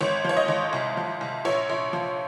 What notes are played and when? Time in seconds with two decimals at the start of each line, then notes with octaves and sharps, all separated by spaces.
0.01 G#1 C#5
0.24 F3 C#5
0.37 D#5
0.48 G#1
0.73 C2
0.97 F3
1.21 C2
1.45 A#1 C#5
1.70 A#1
1.93 F3